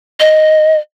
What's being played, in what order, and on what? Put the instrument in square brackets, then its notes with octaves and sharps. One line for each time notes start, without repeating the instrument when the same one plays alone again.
[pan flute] D#5